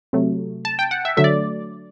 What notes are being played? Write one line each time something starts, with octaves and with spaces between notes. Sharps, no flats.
C3 F#3 A3
A5
G5
F#5
E5
D3 F#3 A3 E5
D5